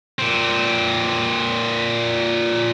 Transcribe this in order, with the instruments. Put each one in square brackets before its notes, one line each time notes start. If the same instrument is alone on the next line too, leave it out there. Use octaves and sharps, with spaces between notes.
[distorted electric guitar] A#2 C4